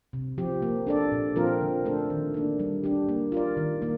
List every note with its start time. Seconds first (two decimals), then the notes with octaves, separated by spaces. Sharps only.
0.13 C3
0.38 F3 C4 G4
0.62 A#3
0.87 D4 A4 D5
1.12 A#2
1.36 F3 C4 F4 A#4
1.61 D3
1.85 A3 D4 A4 C5
2.10 D#3
2.34 A#3 D4
2.59 G3
2.84 D4 G4
3.09 A#3
3.32 F4 A#4 D5
3.57 D#3
3.82 A#3